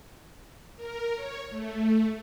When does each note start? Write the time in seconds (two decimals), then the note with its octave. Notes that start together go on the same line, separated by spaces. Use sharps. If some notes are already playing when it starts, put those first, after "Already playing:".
0.76 A#4
1.15 C#5
1.50 A3